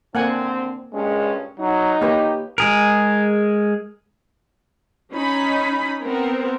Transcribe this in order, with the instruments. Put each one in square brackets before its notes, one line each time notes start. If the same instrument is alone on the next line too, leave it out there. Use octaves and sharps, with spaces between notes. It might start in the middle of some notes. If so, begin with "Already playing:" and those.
[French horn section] D3 C4 [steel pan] A#3 F#5 G#5
[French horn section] G2 A#2 C#4 [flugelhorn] G#3
[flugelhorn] F#3 [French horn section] D#4
[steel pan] A#3 B4 C#5 [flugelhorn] G4
[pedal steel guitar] G#3 G#4 A#4
[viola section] C#4 D#4 B5
B3 C4 A#4